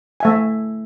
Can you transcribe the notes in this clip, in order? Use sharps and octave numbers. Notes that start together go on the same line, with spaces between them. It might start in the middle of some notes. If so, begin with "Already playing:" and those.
A3 E5 G#5